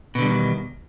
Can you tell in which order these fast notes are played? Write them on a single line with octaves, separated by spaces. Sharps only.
B2 D3 G3 E2 D#3